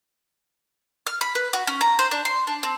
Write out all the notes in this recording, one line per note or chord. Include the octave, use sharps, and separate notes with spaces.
F6
B5
B4
F#4
C#4
A#5
C5
D4
C6
D4
C4